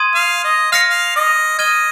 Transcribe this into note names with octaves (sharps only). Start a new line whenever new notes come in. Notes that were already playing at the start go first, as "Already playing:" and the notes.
Already playing: C6 D#6 G#6 D#7
F5
D#5
F5 F6 A#6 C#7
F5
D#5
D#5 F6 G#6 D#7 G7